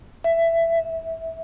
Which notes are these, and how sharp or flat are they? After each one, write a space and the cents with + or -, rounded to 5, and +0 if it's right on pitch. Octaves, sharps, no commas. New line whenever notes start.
E5 +15
E5 -15